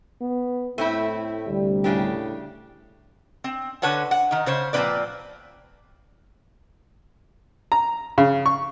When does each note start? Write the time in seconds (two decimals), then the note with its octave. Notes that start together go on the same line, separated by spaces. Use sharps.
0.21 B3
0.78 A2 A3 C4 E4
1.48 D2 C3 G3
1.84 A2 C#3 D4 G4
3.44 C4
3.82 D3 B4 C#5 F#5 A5
4.11 F#5
4.31 D#3 D#4
4.46 C#3 C5 C#5
4.73 A#2 F3 C4 C#4 B4 D5
7.72 A#5
8.18 C#3
8.46 C#6